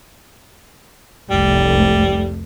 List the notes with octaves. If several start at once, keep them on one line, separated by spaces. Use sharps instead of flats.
F1 C2 G3 A3